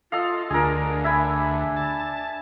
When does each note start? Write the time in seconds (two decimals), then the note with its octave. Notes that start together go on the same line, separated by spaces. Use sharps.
0.12 F4 A4 D#5 F5
0.50 D2 D4 G#4 A#4
1.04 E5 G#5 B5
1.77 A5